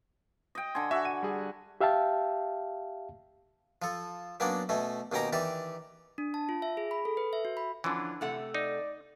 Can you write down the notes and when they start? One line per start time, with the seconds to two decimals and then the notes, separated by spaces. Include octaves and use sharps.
0.55 D#5 G5
0.75 D3 G#5 C6
0.91 F#4 E5 E6
1.05 D#7
1.23 G3 G#4
1.81 G4 E5 F5 G5 A5
3.82 F3 A4
4.40 F#3 A#3 B3 C#4 D4 D5
4.69 B2 A3 C#4
5.12 D#2 B2 C#4 G5 A#5 D6
5.33 D#3 E3 G4 D5
6.18 D4
6.34 A5
6.49 F4
6.62 E5
6.77 G#4
6.91 B5
7.05 A4
7.17 B4
7.33 E5
7.45 F#4
7.57 B5
7.84 D3 E3 F3 C#4 D4
8.21 C3 A3 F#5
8.54 D#4 D5